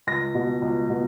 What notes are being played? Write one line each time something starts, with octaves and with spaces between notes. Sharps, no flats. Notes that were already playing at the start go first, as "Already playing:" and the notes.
C#2 A#6
B2
C#2
B2